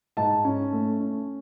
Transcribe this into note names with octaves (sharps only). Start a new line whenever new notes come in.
G#2 A5
C#4
A3
C#4